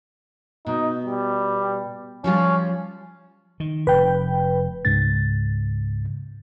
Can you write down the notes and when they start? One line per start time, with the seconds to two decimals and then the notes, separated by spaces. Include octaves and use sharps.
0.66 B2 D#4
1.05 G3
2.24 F3 G3 C#4 F4
3.60 D#3
3.87 F1 B4 G5
4.85 C#2 G#2 C#3 A6